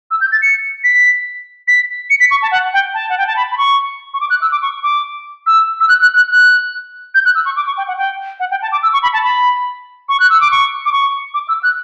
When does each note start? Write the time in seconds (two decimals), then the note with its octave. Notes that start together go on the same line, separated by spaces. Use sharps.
0.11 E6
0.21 G6
0.32 A6
0.42 C#7
0.84 B6
1.68 B6
2.10 C#7
2.20 B6
2.31 C#6
2.42 A5
2.52 F#5
2.73 G5
2.94 A5
3.10 F#5
3.18 G5
3.27 A5
3.36 B5
3.51 B5
3.58 C#6
4.14 C#6
4.21 D6
4.30 F#6
4.42 E6
4.52 D6
4.62 C#6
4.83 D6
5.47 E6
5.80 E6
5.89 F#6
6.02 F#6
6.16 F#6
6.31 F#6
7.15 G6
7.25 F#6
7.35 E6
7.45 C#6
7.56 D6
7.67 C#6
7.78 G5
7.88 F#5
7.98 G5
8.40 F#5
8.51 G5
8.62 A5
8.72 D6
8.83 E6
8.93 C#6
9.03 B5
9.13 A5
9.24 B5
10.09 C#6
10.20 F#6
10.30 E6
10.41 D6
10.51 C#6
10.86 D6
10.92 C#6
11.34 D6
11.48 E6
11.63 F#6